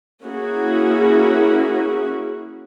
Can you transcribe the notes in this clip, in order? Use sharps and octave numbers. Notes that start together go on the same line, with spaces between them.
A#3 C#4 E4 F#4 G#4